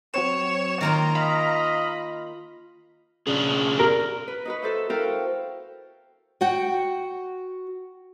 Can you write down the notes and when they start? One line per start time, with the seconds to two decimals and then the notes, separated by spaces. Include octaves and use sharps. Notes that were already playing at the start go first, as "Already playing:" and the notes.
0.14 F#3 C4 C#5 E7
0.81 D#3 A#3 F4 A#5
1.15 D#5 F5 B5
3.27 C#3 D4 F4 G#4
3.79 A#4
4.28 B4
4.45 D#4 F#4 B4
4.62 A4 C5 E5
4.90 E4 F#4 A4 A#4 F5 G5
6.41 F#4 F#5 G5